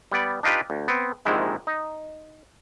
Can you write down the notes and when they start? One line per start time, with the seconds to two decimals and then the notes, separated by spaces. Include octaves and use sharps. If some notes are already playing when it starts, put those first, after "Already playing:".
0.12 G3 B3 D5
0.43 D4 D#4 F4 G4 B4
0.70 D2
0.88 B3 C4
1.25 A#1 G#2 C3 D#3 G#3 E4
1.67 D#4